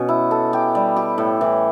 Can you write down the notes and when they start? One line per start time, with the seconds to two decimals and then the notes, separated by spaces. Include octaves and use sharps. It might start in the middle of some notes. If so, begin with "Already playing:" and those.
Already playing: B2 C#4
0.09 E4
0.31 A4
0.53 G4
0.75 G3
0.96 G4
1.18 A2
1.41 E3